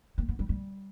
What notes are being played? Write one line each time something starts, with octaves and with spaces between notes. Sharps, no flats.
A#3
B3
G3
G3